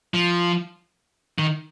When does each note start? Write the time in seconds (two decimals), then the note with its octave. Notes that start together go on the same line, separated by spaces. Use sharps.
0.14 F3
1.38 D#3